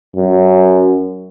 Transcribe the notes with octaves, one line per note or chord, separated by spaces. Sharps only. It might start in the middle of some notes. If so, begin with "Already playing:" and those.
F#2